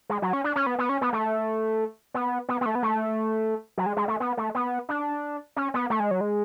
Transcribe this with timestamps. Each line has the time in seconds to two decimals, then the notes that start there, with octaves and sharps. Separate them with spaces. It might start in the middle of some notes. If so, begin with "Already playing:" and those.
0.10 G#3
0.22 F#3
0.33 C#4
0.44 D4
0.56 C#4
0.67 B3
0.79 B3
0.89 C#4
1.01 B3
1.13 A3
2.14 B3
2.49 B3
2.61 B3
2.66 A3
2.75 B3
2.83 A3
3.78 F#3
3.86 G#3
3.97 G#3
4.08 A3
4.20 B3
4.37 A3
4.55 B3
4.89 D4
5.56 C#4
5.74 B3
5.90 A3
6.00 G#3
6.11 F#3
6.21 G#3